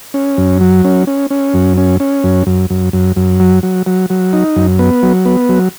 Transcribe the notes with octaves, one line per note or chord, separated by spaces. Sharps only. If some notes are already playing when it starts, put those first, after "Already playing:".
C#4
F#2
F#3
C#4
C#4
C#4
F#2
C#4
C#4
F#2
F#2
F#2
F#2
F#2
F#3
F#3
F#3
F#3
D#4
F#2
B3
F#3
B3
F#3